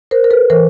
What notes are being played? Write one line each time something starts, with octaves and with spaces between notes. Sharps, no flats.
A#4 C5
A#4
A4 B4
E3 A#4 C5